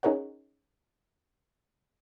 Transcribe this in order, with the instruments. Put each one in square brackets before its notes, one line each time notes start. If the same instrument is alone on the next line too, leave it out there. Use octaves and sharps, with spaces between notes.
[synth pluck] C#4 D#4 G#4 A#4 C#5 F#5